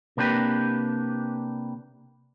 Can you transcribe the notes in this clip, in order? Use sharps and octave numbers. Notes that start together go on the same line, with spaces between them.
C3 A#3 D4 G4 B4